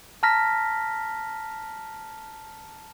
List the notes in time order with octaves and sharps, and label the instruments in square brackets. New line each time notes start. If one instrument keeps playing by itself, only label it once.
[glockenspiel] A5 A#5 F6 A#6 B6